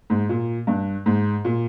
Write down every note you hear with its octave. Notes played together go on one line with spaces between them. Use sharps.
G#2
A#2
G2
G#2
A#2